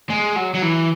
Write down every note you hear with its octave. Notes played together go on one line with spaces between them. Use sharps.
G#3
F#3
F#3
E3